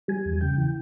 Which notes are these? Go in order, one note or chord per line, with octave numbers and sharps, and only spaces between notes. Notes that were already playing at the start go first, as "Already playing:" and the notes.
G3 G#5
E2
C#3 G5
E3